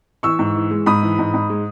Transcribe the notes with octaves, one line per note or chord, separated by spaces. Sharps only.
E3 C#6 E6
G#2
E3
G#3
G#2 B5 D#6
E3
G#2
G#2
G#3